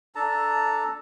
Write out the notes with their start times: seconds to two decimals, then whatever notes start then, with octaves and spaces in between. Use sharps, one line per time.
0.15 D4 A4 A5 A#5